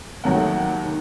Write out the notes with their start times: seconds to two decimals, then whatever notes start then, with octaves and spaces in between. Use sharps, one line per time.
0.24 D#2 D#3 F#3 A3 F#5
0.85 D#3